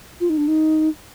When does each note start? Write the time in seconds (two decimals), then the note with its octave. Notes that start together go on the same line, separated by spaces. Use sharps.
0.20 F4
0.30 D#4
0.38 D4
0.48 D#4